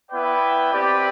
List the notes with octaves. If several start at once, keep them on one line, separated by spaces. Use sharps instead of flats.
B3 E4 B4 D5 G5
C4 G4 B4 D5